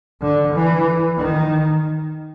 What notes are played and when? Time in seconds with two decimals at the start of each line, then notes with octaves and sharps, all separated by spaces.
0.21 D3
0.53 E3
1.17 D#3